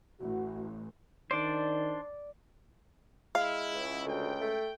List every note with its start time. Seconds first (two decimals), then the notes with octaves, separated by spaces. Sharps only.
0.20 A1 F#4
1.31 D#3 D4 C5 D5
3.35 G#3 E4 F5
3.72 C#2
4.06 D2 G5
4.41 A3